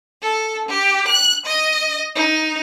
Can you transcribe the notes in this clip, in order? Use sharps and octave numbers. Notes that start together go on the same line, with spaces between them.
A4
G4
F#6
D#5
D#4